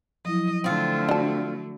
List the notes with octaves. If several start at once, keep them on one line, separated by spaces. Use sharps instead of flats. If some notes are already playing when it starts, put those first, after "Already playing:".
F3 F#3 E4 D#5
D3 A3 C4 F4
D4 F#4 A5